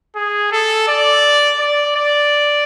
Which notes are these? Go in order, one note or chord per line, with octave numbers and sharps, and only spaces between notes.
G#4
A4
D5
D5
D5